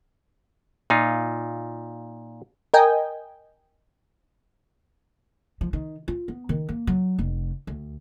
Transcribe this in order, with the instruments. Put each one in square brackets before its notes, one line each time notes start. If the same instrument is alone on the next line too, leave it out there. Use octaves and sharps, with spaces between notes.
[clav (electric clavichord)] A#2 D#4 F4
[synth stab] A#4 D#5 G5 G#5
[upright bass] F3
D#3
F4
B3
D#3
A#3
F#3
F1
D2